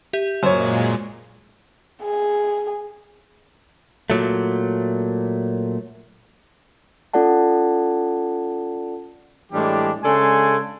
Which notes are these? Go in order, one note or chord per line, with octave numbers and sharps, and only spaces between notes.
G4 E5 G6
F#2 A#2 G#3 C5 C#5 C6
G#4
A#2 F#3 A3
C#4 F4 A4 D5 F#5 A5
A2 E3 G3 G#3 D4 G4
C#3 G#3 D4 A4 G#5 C6